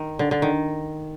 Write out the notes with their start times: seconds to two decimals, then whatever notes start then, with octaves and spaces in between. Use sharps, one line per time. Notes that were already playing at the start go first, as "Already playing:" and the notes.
Already playing: D#3
0.19 D3
0.31 D3
0.42 D#3